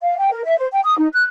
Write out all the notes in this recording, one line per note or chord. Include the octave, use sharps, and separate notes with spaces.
F5
G5
A#4
E5
C5
G5
D#6
D#4
F#6